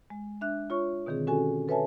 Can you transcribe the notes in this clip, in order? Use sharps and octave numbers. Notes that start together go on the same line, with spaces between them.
G#3
D4 E5 F#6
F4 C#5 C#6
B2 D3 D#3 C4 G#4
C#4 F#4 A4 G#5
A4 B4 C#5 E5 G#5 A5